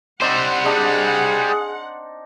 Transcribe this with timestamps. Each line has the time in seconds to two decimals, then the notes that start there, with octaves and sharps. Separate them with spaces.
0.21 G3 C4 D#4 C5 D5 F#5
0.65 D4 D#4 G#4